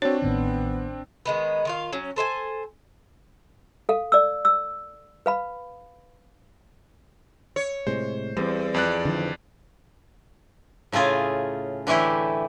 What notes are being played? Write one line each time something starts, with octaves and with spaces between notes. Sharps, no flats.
C4 D4 F#4 C#5
A1 A2 D#3 B3
D#3 G#3 B3
D#3 F4 F5
F#3 C#4
A4 C5 E5 G#5
A4 F5
D5 E6
E6
B4 F5 B5
C#5
A2 C3 G#3 C5
E2 G3 A#3 C4
F2 D5 F#6
D3 D#3 F3
A2 C#3 A3 F4 G#4
D3 E3 A3 E4 G4